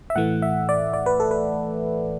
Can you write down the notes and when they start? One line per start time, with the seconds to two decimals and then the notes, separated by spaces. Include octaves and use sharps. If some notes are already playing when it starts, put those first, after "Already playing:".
0.10 E5
0.15 A2 E3 A3 F#5
0.42 E5
0.69 D5
0.94 D5
1.06 B4
1.20 A4
1.31 B4